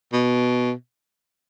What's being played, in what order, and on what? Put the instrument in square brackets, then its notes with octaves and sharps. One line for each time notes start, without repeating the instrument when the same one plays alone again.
[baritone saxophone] B2